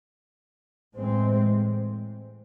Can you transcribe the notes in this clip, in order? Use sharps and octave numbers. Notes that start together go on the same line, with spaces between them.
A2 E3 G#3 C4